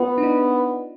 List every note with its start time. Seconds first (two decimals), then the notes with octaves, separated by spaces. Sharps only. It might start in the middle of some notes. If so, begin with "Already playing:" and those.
Already playing: B3 F4
0.18 D4
0.23 D#4